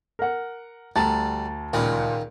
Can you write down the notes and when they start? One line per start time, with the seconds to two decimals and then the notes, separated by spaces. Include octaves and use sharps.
0.19 A#4 F#5
0.96 D2 G3 A5 A#5 A6
1.73 C#2 A#2 D#3 F4 B5